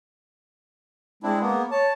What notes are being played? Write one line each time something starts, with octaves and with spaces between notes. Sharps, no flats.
G#3 C4 D4 E4
A#3 B3
C#5 A5